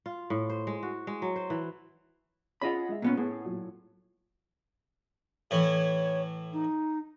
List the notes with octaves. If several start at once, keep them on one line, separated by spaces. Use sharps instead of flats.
F4
A2
C5
G#3
F#4
G#3
F#3
C5
E3
C#4 F4 G#4 D#5 F#5 B5
G#3 E5
A#2 B3 C#4 F4 B4
A2 B3 G#4
A#2 F#3
A2 E3 C#5
D#4